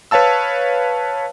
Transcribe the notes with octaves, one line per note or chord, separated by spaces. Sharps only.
B4 C#5 F5 A5 E6